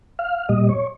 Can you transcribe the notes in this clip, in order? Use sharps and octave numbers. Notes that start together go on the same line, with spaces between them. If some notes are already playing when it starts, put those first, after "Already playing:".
F5
A#2 G3 D#5
C#5